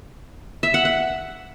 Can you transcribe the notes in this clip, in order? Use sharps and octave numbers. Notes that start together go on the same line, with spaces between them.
E5
F#5
F#5